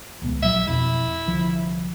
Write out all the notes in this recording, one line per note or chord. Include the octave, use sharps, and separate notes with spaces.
D#1 C#2 B3
A#1 F#3 E5
F2 B2 C4 E4
C2 D3 F3